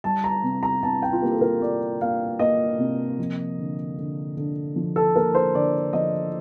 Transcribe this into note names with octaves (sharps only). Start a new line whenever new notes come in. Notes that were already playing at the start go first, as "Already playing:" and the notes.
G3 A5
A#5
C3
A#5
C3 A5
G5
F4
A#3 G4
A4
A#4
A#3 D5
A#3 F5
A#3 D#5
C3
F3
D3
D3
D3
F3
A4
A#3 A#4
C5
D3 D5
F3 D#5